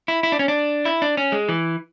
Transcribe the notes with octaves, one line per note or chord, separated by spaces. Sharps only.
E4
E4
D4
C#4
D4
E4
D4
C#4
G#3
E3